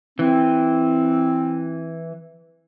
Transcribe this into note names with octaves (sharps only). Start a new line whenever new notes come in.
E3 C4